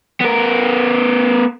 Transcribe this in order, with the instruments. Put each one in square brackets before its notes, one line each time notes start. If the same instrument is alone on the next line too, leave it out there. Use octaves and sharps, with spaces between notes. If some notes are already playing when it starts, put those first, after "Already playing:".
[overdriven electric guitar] B3 A#4